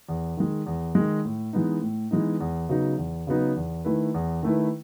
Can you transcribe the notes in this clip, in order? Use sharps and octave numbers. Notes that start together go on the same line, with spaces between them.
E2
D#3 G#3
E2
D#3 G#3
A2
E3 G#3 B3 D#4
A2
E3 G#3 B3 D#4
E2
C#3 F#3 B3 D#4
E2
C#3 F#3 B3 D#4
E2
D#3 A3 E4 B4
E2
D#3 A3 E4 B4